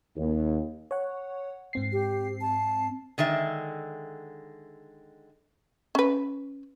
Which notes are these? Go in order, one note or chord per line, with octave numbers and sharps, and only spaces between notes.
D#2
C#5 F#5
G#2 C4 C7
G4
A5
D3 D#3 G#3 E5
C#4 B4